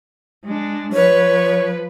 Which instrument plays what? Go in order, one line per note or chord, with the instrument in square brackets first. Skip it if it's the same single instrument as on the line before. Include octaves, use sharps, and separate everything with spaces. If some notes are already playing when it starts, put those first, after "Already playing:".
[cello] G#3 D4
[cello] F3 B4 [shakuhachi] C#5